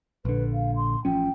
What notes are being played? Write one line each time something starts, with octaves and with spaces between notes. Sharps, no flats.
A#1 D3 B4
F5
C6
A1 F3 C#4 G5